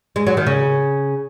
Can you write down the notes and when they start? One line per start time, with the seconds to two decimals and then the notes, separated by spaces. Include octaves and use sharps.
0.16 G#3
0.27 F#3
0.37 D#3
0.46 C#3